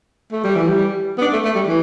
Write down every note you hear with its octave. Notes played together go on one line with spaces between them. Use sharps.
A3
G3
E3
G3
B3
D4
A3
A3
G3
E3